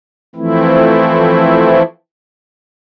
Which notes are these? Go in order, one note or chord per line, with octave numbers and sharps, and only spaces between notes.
E3 F3 A3 C4 E4